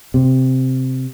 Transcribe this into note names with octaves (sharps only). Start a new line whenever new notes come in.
C3